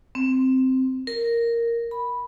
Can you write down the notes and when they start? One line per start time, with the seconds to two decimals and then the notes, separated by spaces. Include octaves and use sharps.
0.15 C4
1.07 A#4
1.91 B5